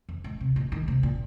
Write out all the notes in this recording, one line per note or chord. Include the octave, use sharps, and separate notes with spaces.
F2
G#2
C3
A#2
D#3
C3
A#2